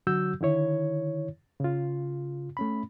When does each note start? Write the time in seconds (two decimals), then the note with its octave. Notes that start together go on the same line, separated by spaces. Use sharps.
0.07 D3 F#3 F#4 E6 G6
0.41 D3 D#3 E4 C#5
1.60 C#3 F4
2.57 A3 C#4 B5